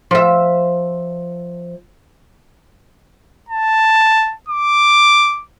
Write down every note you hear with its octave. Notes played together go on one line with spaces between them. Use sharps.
F3 E5
A5
D6